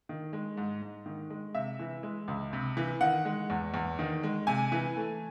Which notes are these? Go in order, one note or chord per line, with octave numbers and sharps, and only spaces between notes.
D#3
G#3
G#2
G#2
D#3
G#3
C3 E5
E3
G#3
C#2
C3
E3
D#3 F#5
G#3
E2
E2
D#3
G#3
C3 G#5
E3
A3